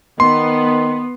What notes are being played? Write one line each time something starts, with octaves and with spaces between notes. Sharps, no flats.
D#3 B3 C6